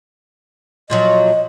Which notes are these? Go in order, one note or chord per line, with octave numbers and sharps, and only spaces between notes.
A#2 F3 F#3 D#5